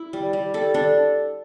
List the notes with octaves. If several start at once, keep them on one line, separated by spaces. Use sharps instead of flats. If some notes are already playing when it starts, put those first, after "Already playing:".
Already playing: E4
G3
G3
G3 A4
D4 A4